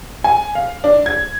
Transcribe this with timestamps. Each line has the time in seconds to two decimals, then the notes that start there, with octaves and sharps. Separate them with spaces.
0.24 G#5
0.55 F5
0.84 D4
1.06 G#6